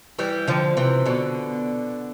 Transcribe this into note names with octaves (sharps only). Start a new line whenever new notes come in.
E3 G3
D3 F3
C3 E3
B2 D3